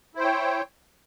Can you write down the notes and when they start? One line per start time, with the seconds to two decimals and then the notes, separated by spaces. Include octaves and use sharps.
0.15 E4
0.18 C5
0.21 G5
0.24 C#5